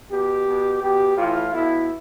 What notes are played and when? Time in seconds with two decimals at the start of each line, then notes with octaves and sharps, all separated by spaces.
0.11 B2 G4
0.46 B2
0.81 B2 G4
1.16 A2 E3 F4
1.52 B2 E4